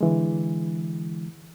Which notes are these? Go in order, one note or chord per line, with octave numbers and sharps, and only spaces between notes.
D3 E3 G#3